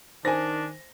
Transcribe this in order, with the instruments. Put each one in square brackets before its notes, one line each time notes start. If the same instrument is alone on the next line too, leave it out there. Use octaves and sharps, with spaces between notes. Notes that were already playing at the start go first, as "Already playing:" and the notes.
[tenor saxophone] D#3 [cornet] D4 [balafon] C5 [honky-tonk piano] G#5 A#6